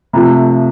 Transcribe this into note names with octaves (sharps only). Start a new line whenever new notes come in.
C3 F3 A3